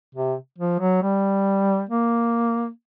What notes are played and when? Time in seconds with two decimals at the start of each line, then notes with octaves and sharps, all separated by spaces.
0.15 C3
0.58 F3
0.80 F#3
1.03 G3
1.90 A#3